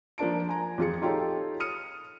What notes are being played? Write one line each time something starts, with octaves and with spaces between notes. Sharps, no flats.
F3 A#3 D4 A5 D7
G#5 A#5
F2 F4 G#4 C#7
D#4 F4 G4 A4 C#5
D#6 F6 C#7 D#7